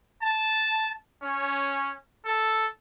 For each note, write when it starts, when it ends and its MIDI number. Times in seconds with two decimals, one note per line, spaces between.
0.21 0.90 81
1.21 1.93 61
2.24 2.64 69